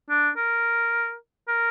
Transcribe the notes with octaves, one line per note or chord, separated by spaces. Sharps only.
D4
A#4
A#4